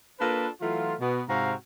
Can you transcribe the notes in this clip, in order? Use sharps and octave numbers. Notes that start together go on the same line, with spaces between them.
A#3 D4 F4 A4 B4
E3 F#3 A3 F4
B2 B3 F#4
G#2 C3 C4 F#4 F5 A#5